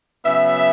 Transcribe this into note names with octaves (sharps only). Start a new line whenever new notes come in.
C#3 F#3 B3 E5